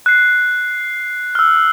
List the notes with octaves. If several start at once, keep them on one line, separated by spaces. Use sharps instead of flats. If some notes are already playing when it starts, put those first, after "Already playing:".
F#6 C7
E6 F6